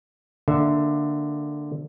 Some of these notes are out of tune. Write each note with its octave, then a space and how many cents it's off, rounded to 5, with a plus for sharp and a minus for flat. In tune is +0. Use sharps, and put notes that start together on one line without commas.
D3 +5 A#3 -15 E5 +0